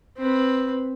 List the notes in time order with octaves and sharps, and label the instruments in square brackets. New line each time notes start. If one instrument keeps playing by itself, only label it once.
[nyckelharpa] C4 B4